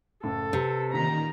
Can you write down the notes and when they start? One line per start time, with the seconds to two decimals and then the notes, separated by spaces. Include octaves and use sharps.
0.23 F#1 A2 C#3 A4
0.53 C3 B4
0.92 A1 A#2 D#3 A#5 B6